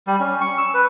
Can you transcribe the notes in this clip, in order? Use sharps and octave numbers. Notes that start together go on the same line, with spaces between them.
G3
C#4
C#6
E6
B4